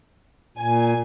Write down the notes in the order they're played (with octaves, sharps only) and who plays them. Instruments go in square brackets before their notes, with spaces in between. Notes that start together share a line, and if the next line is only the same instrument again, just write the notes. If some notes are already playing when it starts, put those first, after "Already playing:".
[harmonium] A#2 [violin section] G#5